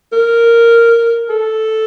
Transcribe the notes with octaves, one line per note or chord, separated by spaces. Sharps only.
A#4
A4